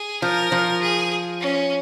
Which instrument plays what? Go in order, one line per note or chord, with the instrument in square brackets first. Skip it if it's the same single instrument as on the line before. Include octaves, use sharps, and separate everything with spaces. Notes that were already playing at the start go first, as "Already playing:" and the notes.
Already playing: [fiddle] G#4
[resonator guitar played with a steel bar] F3 [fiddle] A#4
[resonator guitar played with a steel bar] F3
[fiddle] G#4
C#4